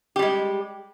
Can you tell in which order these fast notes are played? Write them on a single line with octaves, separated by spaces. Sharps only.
G4 G3 G#3